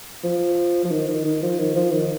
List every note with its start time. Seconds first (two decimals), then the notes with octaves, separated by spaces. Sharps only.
0.24 F3
0.85 F3
0.91 D#3
1.08 D#3
1.25 D#3
1.43 F3
1.60 D#3
1.76 F3
1.92 D#3